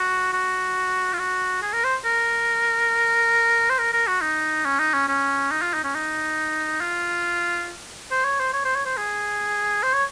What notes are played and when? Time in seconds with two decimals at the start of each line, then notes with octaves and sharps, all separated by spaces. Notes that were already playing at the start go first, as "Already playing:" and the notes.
Already playing: F#4
0.33 F#4
1.13 F4
1.19 F#4
1.62 G#4
1.73 A#4
1.84 C5
2.05 A#4
3.69 C5
3.78 A#4
3.93 A#4
4.07 F#4
4.22 D#4
4.65 C#4
4.80 D#4
4.94 C#4
5.09 C#4
5.51 D#4
5.62 F4
5.74 D#4
5.84 C#4
5.95 D#4
6.81 F4
8.11 C5
8.25 C#5
8.40 C5
8.53 C#5
8.65 C5
8.75 C#5
8.86 C5
8.97 G#4
9.83 C5
9.94 C#5